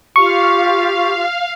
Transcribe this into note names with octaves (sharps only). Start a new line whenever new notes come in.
F4 G4 F5 C#6